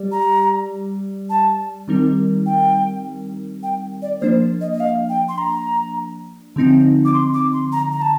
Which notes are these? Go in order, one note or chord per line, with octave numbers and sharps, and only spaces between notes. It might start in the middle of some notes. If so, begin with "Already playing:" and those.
Already playing: G3 G4 D5
A#5
A5
D#3 G3 C4 D#4 A#4
G5
G5
D5
F3 A#3 D4 C5
D#5
D#5
F5
G5
C6
A#5
D3 F3 C4 D#4
D6
C6
D6
C6
A#5
A#5
A5